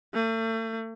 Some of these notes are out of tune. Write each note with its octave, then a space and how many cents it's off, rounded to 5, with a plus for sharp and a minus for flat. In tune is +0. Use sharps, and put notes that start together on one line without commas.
A3 +40